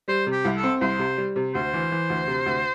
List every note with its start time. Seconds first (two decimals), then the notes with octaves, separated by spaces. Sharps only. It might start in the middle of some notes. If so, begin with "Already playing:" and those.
0.08 G3 C5
0.26 C3
0.32 G4
0.45 C2
0.57 A4
0.63 C4
0.81 C2 C5
0.99 C3
1.17 G3
1.36 C3
1.55 D2 C5
1.73 E3
1.92 E3
2.10 D2
2.27 C3
2.46 D2